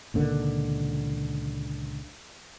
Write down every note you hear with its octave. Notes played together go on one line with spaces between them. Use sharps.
C#2 A#2 D3 D#3